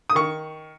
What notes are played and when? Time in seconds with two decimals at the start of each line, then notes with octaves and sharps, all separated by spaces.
0.10 D#6
0.15 D#3 C#6